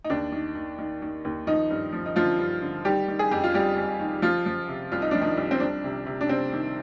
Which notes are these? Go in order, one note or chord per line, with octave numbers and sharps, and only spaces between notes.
D#4
D#2 D4
D#3
D#3
D#3
D#3
D#2
D#3 F3 D#4
G2
F3
D#4
D3 F3 F4
G2
D3
D#3 G3 G4
D#3
G#4
F2 G4
F4
F2 G3 G4
F2
D#3
F3 F4
F3
C3
C2 F4
D#4
F3 D4
D#3 D#4
C2
C4
C2 D4
C3
C3
D4
C3 C4
D#3